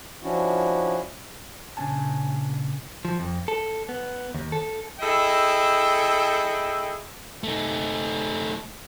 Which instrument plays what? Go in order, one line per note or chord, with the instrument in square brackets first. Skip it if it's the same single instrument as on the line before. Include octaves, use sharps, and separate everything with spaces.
[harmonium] F3 C#4 D4 E4 F#4
[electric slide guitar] A#2 C#3 C#4 D4 G#5 A5
[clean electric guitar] F3
F2
A4
B3
D#2
A4
[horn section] E4 G#4 A4 D#5 G5
[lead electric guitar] A3 D#4